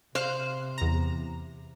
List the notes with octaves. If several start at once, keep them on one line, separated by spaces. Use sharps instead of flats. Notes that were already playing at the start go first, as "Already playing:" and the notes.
C3 C5 F5 F6 F#6
E2 A#5